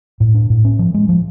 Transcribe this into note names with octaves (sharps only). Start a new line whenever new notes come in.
A2
D4
A2
C#4
F3
G#3
F3